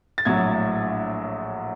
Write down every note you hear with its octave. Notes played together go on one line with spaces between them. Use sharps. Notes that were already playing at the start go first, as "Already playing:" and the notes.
A6
A#1 A2 F#3 G#6